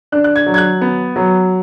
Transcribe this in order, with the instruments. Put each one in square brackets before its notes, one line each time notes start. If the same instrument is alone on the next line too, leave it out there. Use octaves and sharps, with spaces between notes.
[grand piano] D4 F#6
F#6
G#6
F#3
G#6
F#6
B3
F#3